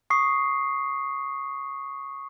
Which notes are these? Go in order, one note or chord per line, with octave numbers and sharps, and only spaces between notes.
C#6 D#6 C7